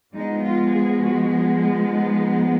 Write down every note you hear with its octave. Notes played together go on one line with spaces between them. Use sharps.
F3 G#3 B3 D#4
F4
G#4
F#4
G#4
G#4
D#4